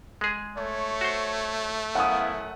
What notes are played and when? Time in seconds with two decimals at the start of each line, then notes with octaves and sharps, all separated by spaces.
0.21 G#3 G#4
0.58 A3 C#5
1.01 F#4 C5
1.95 F#2 B3 E4 F5 F#5 D#6